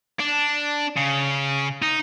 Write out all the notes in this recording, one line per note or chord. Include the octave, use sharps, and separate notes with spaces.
D4
C#3
D#4